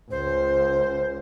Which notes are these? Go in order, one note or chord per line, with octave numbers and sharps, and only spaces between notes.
C#2 C5